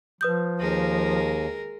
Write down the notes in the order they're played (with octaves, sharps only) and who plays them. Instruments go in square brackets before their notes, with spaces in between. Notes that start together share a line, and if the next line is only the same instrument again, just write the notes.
[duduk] F3 [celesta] B4 D#6 G6
[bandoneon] D#2 [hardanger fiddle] G#3 A#4